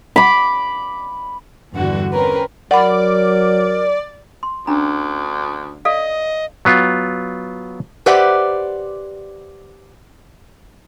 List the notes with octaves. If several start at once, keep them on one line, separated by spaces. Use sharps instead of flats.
B5 D6
E2 G2 D3 F#4
C4 C#4 A#4 B4
F#3 A#4 D5 F#5 B5
C6
D2 C#4 D4 A#5
A4 D5 D#5 F5
F#3 B3 F4
G4 B4 C5 D5 E5 F#5